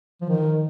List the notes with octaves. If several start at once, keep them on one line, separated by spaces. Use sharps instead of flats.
F3
D#3